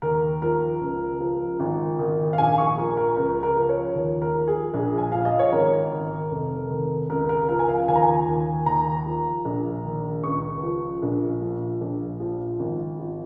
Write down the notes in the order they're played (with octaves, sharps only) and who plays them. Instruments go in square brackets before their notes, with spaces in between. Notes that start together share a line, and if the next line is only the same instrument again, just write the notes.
[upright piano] D#2 A#4
F3 A#4
C#2
F3
G#1
D#3
F5
A#1 G#5
C#6
F3 A#4
A#4
C#2 A#4
A#4
F3
C#5
D#2
A#4
F3
G#4
A#1
G#5
F3 F5
D#5
C#5
G#1 A#4
D#3
F1
D#3
C#2 A#4
A#4
F3 A#4
G#5
F5
D#2 G#5
A#5
G#5
D#2
D#2 A#5
F3
A#1
D#3
C#2 C#6
F3
A#1
F3
A#1
F3
G#1
F3